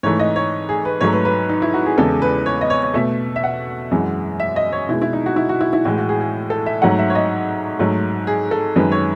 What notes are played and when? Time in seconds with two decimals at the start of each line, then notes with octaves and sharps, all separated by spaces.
0.03 G#2 E3 A3 C#5
0.19 D#5
0.36 C#5
0.69 G#4
0.85 B4
1.01 G#2 F#3 A3 C#5
1.13 B4
1.25 B4
1.49 D#4
1.62 E4
1.74 F#4
1.86 G#4
1.98 E2 C#3 G#3 A4
2.22 B4
2.46 C#5
2.61 D#5
2.70 C#5
2.83 C#5
2.94 B2 A3 E5
3.36 E5
3.44 F#5
3.91 F#2 E3 G#3
4.40 E5
4.56 D#5
4.72 C#5
4.89 B2 E4
4.93 G#3
5.02 E4
5.13 D#4
5.26 F#4
5.36 E4
5.49 F#4
5.61 E4
5.73 E4
5.85 A2 E3 G#3 F#4
5.98 F#4
6.09 G#4
6.21 G#4
6.50 A4
6.66 E5
6.82 G#2 F#3 A3 F#5
6.99 E5
7.10 C#5
7.15 D#5
7.79 G#2 F#3 A3
8.27 G#4
8.51 A4
8.76 F#2 D#3 G#3 B4
8.92 C#5